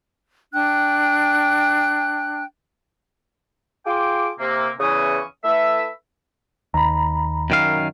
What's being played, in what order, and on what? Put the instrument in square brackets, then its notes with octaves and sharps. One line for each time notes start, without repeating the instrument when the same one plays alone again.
[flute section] D4 G5 F#6
[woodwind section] F4 G#4 G5 C6 D6
C3 A#3
E2 C#3 E3 C#4 C#6 D#6
A3 E4 A4 B4 E5
[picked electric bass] D#2 [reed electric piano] A#5 B5
[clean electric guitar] F#2 D#3 F5